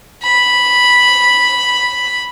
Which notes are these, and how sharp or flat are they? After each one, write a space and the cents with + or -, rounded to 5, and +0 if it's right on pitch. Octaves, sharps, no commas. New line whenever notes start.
B5 -5